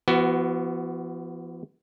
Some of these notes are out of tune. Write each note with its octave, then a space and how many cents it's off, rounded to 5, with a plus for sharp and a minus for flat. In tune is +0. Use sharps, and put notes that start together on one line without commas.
F3 -40 B3 +0 F#4 +25